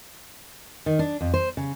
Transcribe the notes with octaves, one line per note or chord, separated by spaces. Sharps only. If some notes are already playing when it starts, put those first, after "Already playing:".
D#3
D4
F2
C5
C#3